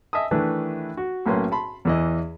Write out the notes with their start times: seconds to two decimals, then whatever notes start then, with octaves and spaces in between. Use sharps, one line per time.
0.13 D#5 E5 G#5 A5 D#6
0.31 D#3 E3 A3 D4 B4
0.97 F#4
1.26 B1 A2 A#3 C#4 B4 C6
1.52 A5 B5 C6
1.85 E2 E3 D#5